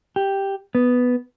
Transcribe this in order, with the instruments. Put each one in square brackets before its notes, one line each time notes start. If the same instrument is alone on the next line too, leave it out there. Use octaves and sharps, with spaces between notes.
[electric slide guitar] G4
B3